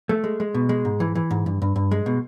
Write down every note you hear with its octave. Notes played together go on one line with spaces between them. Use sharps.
A3
G#3
G#3
B2
G#3
G#2
E3
E3
G#2
G2
G2
G2
G#3
B2